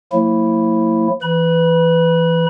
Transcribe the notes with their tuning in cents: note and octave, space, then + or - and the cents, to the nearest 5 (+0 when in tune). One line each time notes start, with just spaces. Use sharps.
F3 +35 A#3 -45 E4 +0
E3 +10 B4 +15 B5 -30